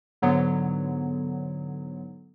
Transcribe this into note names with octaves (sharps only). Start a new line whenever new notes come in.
G#2 D3 F#3 B3